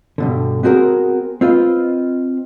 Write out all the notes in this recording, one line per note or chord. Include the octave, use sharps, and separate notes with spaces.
G2 B2 D3
B3 C4 F#4 G#4 A#4
C4 F4 B4 D#5